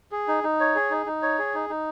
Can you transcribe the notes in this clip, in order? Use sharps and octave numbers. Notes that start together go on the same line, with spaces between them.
G#4
D#4
D#4
C#5
G#4
D#4
D#4
C#5
G#4
D#4
D#4